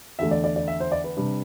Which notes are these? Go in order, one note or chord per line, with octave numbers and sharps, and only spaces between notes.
E2 D3 A3 E5
D5
D5
D5
E5
C5
D5
B4
C3 G3 D4